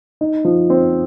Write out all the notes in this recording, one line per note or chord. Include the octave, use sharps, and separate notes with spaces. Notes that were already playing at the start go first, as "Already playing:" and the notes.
D#4
F3
C4